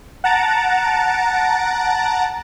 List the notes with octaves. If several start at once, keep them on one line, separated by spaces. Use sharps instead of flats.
F#5 A5 A#5 A6 D7